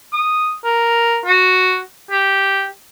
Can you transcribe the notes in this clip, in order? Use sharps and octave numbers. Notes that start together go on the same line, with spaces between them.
D#6
A#4
F#4
G4